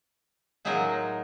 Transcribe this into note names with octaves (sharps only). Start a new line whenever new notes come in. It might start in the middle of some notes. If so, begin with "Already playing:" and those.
A2 F#3 D#4 F4 G#4 A#4